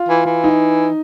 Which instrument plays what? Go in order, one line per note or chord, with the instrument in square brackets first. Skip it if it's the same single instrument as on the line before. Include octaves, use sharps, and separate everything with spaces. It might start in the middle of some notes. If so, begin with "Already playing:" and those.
Already playing: [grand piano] F4
[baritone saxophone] E3
E3
[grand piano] D#4